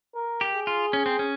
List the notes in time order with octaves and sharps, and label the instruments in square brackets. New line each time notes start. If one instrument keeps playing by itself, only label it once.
[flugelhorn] A#4
[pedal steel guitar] G4
[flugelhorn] G#4
[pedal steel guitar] F4
C#4
C4
C#4